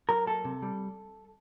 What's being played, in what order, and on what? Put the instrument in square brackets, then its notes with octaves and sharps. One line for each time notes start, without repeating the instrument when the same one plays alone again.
[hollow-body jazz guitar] F#3 A#4
A#3 A4
C3
G3